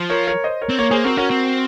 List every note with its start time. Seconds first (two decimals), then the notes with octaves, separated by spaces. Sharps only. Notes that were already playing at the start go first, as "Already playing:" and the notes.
Already playing: F3
0.10 A#4 C#5
0.27 A#4 C#5
0.44 C5 D#5
0.61 A#4 C#5
0.69 C4
0.79 A#3 A#4 C#5
0.91 A#3 G#4 C5
1.04 C4 F#4 A#4
1.17 C#4 F#4 A#4
1.30 C4